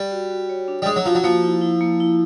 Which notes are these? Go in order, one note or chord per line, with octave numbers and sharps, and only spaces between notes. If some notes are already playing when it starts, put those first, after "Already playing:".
Already playing: G3
F#4
F#4
C#5
D4
G3
G#3 D4
F#3
F3 F#4
F#3
F3 A#3
E4
E4
A#3
E4